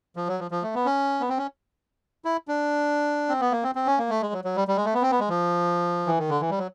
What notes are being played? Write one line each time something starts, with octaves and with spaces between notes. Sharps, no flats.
F3
F#3
F3
F3
A3
B3
C#4
B3
C4
C#4
E4
D4
C4
B3
A#3
C4
C4
C#4
A#3
A3
G#3
F#3
F#3
G3
G3
G#3
A3
B3
C4
B3
G#3
F3
E3
D#3
D3
E3
G3
F#3